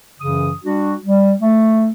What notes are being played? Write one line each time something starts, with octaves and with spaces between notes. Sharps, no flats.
F#2 C#3 E3 D#6
G3 D4 F#4
G3
A3